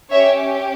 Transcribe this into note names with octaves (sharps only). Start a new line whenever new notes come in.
C#4 G4 C#5 E5